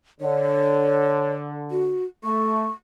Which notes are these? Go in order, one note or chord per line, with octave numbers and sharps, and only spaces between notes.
D3 C#5
F#4
A3 C#6